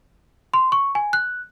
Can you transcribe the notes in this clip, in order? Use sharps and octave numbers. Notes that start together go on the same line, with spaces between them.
C6
C#6
G#5
F#6